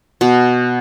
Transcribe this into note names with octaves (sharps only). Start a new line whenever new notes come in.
B2